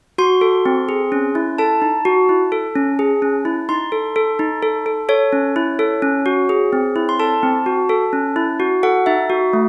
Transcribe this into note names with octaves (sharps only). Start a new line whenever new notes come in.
F#4 C6
A4
C4
G#4
C#4
E4
A4 A5
D#4
F#4
E4
A4
C#4
G#4
C#4
E4
D#4 C6
A4
A4
D#4
A4
A4
A4 C#5
C#4
E4
A4
C#4
F#4
G#4
C4
E4
C6
A4 A5
C4
F#4
A4
C#4
E4
F#4
A4 F#5
D#4 E5
F#4
A3